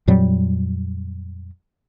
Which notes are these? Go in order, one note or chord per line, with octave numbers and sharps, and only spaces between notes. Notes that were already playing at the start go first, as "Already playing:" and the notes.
F2 A#2 F#3 G3